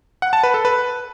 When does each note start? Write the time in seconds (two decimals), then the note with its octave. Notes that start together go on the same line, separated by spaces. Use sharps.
0.22 F#5
0.33 A5
0.43 B4
0.54 A4
0.65 B4